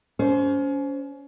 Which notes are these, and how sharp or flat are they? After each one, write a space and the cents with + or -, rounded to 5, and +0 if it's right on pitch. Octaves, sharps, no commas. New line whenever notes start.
C#4 +30 C5 +0